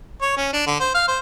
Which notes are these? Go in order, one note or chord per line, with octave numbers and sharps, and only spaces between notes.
C#5
C#4
D4
D3
C5
F5
C5